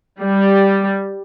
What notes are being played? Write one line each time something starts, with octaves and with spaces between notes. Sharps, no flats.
G3